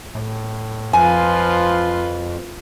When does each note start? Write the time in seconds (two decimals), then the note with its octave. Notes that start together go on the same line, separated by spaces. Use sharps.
0.15 A2
0.93 F2 F3 F4 B4 G#5